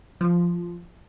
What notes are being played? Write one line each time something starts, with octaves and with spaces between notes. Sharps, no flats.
F3